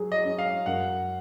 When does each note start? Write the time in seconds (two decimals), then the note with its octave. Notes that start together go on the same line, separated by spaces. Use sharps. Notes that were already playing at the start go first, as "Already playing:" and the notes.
Already playing: F#3 G#4
0.12 D#5
0.25 C#4
0.38 F5
0.66 F#2 F#5